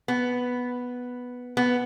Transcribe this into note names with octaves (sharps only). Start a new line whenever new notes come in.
B3
B3